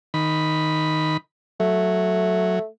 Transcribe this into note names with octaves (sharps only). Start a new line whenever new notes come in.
D#3 B5
F#3 A3